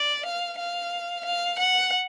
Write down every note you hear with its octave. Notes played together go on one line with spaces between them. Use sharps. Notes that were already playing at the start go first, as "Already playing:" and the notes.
Already playing: D5
F5
F5
F5
F#5